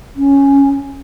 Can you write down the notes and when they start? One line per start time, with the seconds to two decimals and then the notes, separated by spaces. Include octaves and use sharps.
0.16 C#4